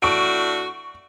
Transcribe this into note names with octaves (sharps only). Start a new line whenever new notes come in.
A2 D4 F#4 C#6 D7